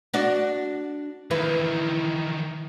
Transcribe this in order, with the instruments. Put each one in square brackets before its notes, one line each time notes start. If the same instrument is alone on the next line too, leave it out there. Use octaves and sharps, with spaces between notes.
[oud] D4 F#4 D5
[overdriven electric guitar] D#3 E3 [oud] E4 B4